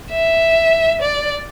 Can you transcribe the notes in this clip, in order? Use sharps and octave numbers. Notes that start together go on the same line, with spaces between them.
E5
D5